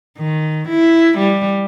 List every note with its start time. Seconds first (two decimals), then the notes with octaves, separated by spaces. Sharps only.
0.18 D#3
0.69 E4
1.18 G3